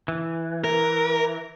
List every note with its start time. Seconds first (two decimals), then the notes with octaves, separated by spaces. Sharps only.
0.08 E3
0.64 A#4